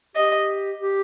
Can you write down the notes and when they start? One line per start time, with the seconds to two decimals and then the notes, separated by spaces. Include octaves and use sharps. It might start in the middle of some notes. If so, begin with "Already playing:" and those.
0.16 G4 D#5
0.78 G4